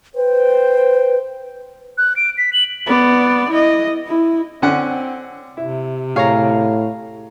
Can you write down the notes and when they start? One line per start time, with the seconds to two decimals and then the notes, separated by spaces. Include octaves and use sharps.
0.15 B4 C5 G5
1.98 F#6
2.16 D7
2.38 B6
2.53 F#7
2.86 B3 D5
3.50 E4 D#5
4.07 E4
4.62 D3 C4 C#4 F#5
5.57 C3 E4
6.16 A2 G#4 C#5 F5 A#5